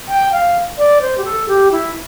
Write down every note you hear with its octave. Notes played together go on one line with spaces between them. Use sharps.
G5
F5
D5
C5
G4
A4
G4
E4